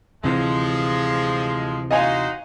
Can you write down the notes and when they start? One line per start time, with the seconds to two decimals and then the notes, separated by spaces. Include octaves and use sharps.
0.24 D2 C3 E3 F3 G#3
1.91 D#4 F#4 C5 D#5 F5 G#5